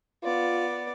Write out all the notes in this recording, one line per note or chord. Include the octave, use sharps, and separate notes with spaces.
B3 F4 D5